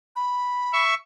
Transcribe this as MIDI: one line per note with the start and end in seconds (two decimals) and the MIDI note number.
0.16 0.82 83
0.73 0.94 76
0.73 0.94 85